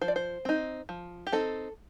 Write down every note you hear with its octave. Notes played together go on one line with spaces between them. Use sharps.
F3 C5
D5
C5
C4 D#4
F3
G4
C4 D#4 A4